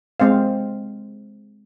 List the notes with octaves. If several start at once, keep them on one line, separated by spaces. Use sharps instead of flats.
G#3 C4 C5 F5